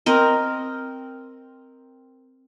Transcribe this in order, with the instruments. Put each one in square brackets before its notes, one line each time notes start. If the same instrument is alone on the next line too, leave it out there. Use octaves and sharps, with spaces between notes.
[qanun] C4 A#4 D#5